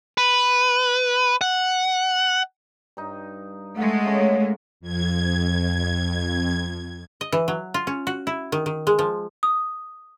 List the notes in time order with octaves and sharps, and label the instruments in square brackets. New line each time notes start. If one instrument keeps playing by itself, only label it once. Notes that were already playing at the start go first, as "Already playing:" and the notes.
[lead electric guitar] B4
F#5
[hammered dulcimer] G2 D#4
[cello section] G#3 A3 [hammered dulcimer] D#5 F5 F#5
[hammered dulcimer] C#3 A#3 C#4
[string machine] F2 G#6
[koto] D#5
E3
F#3
F4
C#4
F#4
E4
D#3
D#3
G#3
F3
[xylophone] D#6